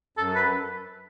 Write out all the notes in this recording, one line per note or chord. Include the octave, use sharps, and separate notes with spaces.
F#2 A4
B4